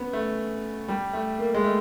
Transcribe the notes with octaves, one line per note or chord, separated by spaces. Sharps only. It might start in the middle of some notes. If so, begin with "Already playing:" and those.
Already playing: B3 C#4
A3
G3
A3
A#3
G#3
A3